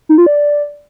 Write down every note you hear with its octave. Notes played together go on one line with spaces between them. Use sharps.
D#4
F4
D5